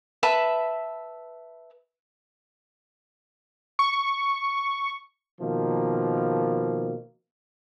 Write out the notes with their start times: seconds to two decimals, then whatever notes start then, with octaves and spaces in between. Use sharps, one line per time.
0.23 B4 E5 A5 B5
3.79 C#6
5.39 B2 D#3 F3 A#3